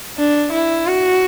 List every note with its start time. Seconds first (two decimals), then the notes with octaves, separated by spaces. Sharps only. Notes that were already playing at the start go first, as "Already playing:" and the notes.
0.18 D4
0.53 E4
0.86 F#4